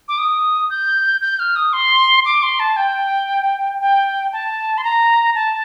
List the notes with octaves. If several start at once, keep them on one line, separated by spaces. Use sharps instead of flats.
D6
D#6
G6
G6
F6
D#6
C6
D6
C6
A5
G5
G5
A5
C6
A#5
A5